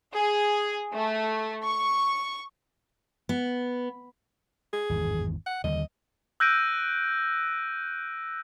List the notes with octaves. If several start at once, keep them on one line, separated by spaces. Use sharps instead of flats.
G#4
A3
C#6
B3
G#4
G#1 E2 G2
F#5
D#2 D3 G3 D#5
E6 F#6 G6 A#6 D7 D#7